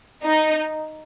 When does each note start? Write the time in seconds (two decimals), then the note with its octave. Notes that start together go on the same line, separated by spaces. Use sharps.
0.23 D#4